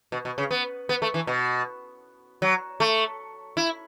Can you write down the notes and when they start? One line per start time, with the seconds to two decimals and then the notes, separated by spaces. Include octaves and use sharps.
0.12 B2
0.25 B2
0.38 C#3
0.51 B3
0.89 B3
1.02 A3
1.14 E3
1.27 B2
2.42 F#3
2.80 A3
3.57 E4